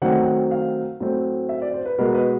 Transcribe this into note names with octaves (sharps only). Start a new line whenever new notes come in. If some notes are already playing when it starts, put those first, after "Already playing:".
D#3 F#3 A3 C4 F#5
F5
A2 F#3 A3 C4
E5
D5
C5
B4
B2 G#3 B3 A#4
B4